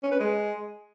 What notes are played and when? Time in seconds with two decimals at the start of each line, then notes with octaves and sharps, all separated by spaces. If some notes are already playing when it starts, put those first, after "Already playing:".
0.03 C#4
0.11 B4
0.20 G#3